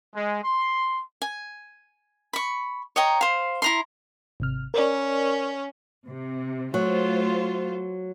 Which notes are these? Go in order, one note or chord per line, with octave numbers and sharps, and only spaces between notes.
G#3
C6
G#5
B5 C#6
C#5 D#5 G5 A#5
C5 F5
E4 A#5 C6
G#1 C3 F6
C#4 A#4 D5
C3
F#3 A3 F4 C5